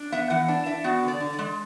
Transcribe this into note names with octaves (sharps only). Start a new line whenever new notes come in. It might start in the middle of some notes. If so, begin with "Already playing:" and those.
Already playing: D4
B3 E5
E3 F#5
D4
D4 E5
B3 F#4
D3
D5
D3
D5
G#3